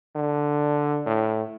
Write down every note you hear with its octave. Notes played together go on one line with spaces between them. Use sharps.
D3
A2